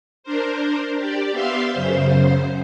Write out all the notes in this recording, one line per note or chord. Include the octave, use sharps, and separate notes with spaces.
D4 A#4 C5
G4 D5
B3 E5 F5 C6
F#2 C#3 C5